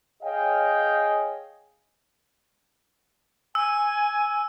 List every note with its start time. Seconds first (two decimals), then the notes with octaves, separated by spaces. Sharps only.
0.23 G#4 C#5 D#5 F5 G5 G#5
3.55 G#5 E6